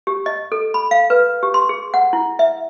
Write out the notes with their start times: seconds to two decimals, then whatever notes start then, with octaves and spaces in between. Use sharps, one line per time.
0.07 G4
0.26 D#5
0.52 A4
0.74 B5
0.91 F5
1.10 B4
1.43 G4
1.54 C6
1.69 G#4
1.94 F#5
2.13 E4
2.39 E5